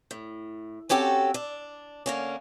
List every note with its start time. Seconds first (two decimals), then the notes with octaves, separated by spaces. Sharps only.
0.11 A2
0.89 C4 C#4 F#4 G4 A4
1.34 D4
2.06 D3 A#3 C#4